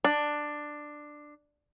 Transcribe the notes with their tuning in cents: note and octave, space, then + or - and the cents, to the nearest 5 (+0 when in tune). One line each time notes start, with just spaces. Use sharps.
D4 +10